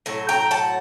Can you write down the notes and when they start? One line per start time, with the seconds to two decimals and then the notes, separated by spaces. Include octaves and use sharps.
0.06 A2 F#3
0.29 G5 A#5
0.51 F#5 A5